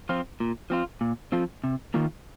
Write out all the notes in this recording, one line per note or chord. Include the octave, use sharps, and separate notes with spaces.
F3 C4 F4
A#2
F3 C4 F4
A#2
F3 C4 F4
C3
D#3 A#3 F4